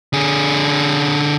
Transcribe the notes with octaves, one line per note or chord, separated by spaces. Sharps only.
D3 G#4